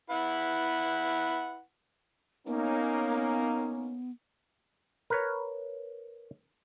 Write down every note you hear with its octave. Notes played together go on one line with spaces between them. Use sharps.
E4 B4 F#5
A#3 B3 C#4 D#4
A#4 B4 C#5